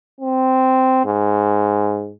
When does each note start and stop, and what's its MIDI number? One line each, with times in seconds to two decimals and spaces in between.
0.21 1.05 60
1.05 2.12 44